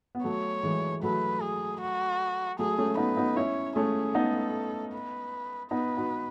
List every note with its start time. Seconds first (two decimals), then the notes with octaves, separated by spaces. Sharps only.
0.15 B3
0.24 F#3 A3 C#5
0.63 E3 G#3
1.03 F#3 A3 B4
1.41 G#4
1.81 F#4
2.59 F#3 A3 G#4
2.78 A3 C#4
2.97 B3 D#4 B4
3.17 B3 D#4
3.36 C#4 E4 C#5
3.76 A3 C#4 G#4
4.15 B3 D#4 A4
4.93 B4
5.71 B3 D#4 B4
5.97 D#4 F#4